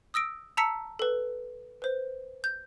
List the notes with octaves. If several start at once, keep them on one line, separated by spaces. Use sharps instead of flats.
D#6 E6 A#6 D7
A5 A#5 E6 B6 C#7
A4 B4
B4 C5
G6